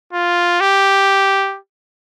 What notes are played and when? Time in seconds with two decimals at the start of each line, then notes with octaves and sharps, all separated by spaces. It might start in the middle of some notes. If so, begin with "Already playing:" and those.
0.13 F4
0.60 G4